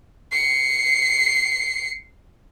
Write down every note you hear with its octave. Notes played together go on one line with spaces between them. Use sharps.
C7 C#7